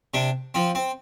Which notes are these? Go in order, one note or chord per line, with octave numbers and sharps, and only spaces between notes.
C3 D4
F3 C4
C4